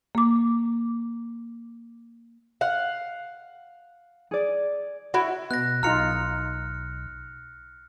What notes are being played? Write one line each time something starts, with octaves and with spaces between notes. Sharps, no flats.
A#3 D6
F5 F#5
G#4 D5
E4 F#4
B2 F#6 A#6
B1 D#4 F4 A#5 F6 C#7